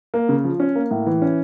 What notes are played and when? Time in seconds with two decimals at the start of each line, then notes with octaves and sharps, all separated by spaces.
0.14 A#3
0.29 C#3
0.44 F3
0.60 C#4
0.75 A#3
0.91 A2
1.06 E3
1.22 C#4